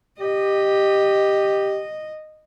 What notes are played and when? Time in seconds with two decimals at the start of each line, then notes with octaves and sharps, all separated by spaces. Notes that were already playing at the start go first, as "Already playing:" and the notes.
0.20 G4 D#5